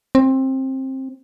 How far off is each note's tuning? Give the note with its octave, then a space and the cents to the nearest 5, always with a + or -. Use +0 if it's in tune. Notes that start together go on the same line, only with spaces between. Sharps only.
C4 +20